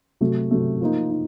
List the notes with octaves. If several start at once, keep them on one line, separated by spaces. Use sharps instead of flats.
C3 F#3 A3
C3 F#3 A3
F3 A#3 D#4
D#4